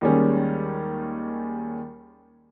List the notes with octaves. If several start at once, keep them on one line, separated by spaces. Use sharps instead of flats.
D#2 D#3 G3 G#3 C#4